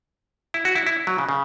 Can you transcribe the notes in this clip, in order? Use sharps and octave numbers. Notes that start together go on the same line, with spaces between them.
E4
F#4
E4
E4
F#3
C#3
C#3